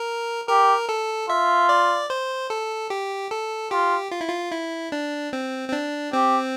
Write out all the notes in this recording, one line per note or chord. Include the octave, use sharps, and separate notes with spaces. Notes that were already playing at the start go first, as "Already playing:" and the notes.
Already playing: A#4
G4 A#4
A4
F4 E5
D5
C5
A4
G4
A4
F4 G4
F4
E4
F4
E4
D4
C4
C4
D4
C4 G4